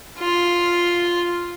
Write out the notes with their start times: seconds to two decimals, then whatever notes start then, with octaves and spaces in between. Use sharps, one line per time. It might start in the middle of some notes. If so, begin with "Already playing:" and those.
0.19 F4